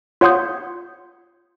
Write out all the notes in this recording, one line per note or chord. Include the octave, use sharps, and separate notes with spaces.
F4 C#5 F#5 C6 D#6 G6